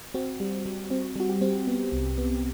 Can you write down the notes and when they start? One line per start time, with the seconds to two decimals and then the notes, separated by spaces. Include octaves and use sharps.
0.14 C4 F#4
0.40 G3
0.66 G3
0.90 C4
1.16 G3 F#4
1.29 G4
1.41 C4
1.67 B3
1.92 C2
2.18 B3